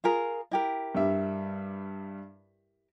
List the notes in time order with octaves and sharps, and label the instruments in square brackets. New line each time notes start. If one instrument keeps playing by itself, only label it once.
[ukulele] F4 G#4 A#4
E4 G4 A#4
[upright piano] G2 G3 E5